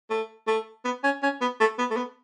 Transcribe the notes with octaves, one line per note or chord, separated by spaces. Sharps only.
A3
A3
B3
C#4
C#4
B3
A3
B3
A3
B3